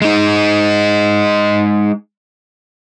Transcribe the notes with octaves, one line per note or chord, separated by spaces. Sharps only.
G#3 D#4